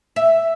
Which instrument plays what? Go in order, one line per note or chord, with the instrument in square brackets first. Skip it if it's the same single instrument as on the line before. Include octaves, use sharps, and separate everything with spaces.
[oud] E5